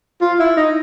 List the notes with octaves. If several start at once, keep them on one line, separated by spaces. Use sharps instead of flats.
F4
E4
D#4